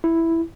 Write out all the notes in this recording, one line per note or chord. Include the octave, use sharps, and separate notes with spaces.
E4